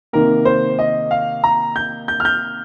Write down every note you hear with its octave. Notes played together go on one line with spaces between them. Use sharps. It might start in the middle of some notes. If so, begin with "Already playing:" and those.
C3 D#3 A#3 A#4
C5
D#5
F5
A#5
G6
G6
F6
G6